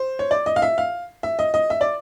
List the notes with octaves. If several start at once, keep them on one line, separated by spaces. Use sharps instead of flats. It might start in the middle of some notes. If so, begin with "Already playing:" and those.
Already playing: C5
C#5
D5
D#5
F5
E5
F5
E5
D#5
D#5
E5
D5